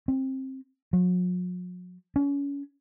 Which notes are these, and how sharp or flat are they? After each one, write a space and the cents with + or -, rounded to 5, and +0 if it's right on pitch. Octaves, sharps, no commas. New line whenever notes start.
C4 +20
F#3 -45
C#4 +30